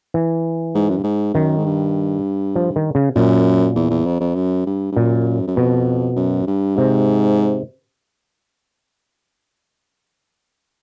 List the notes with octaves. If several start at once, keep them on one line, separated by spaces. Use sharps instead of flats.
E3
G#2
F#2
G2
G#2
F#2 D#3
G#2
G2
F3
D#3
C#3
F#2 A#2
E2
E2
F2
F2
F#2
G2
G2
F#2 A#2
F#2
F2 B2
F#2
G2
G#2 C3